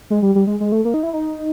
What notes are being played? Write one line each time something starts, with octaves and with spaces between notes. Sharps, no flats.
G#3
G3
G3
G#3
G#3
A3
A#3
D#4
E4
D#4